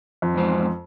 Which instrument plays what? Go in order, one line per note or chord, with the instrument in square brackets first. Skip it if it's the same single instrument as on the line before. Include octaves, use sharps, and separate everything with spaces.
[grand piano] F2
[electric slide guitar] E2 G#2 C5